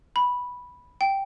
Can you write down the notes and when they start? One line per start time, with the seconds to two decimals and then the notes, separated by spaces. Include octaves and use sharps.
0.16 B5
1.01 G5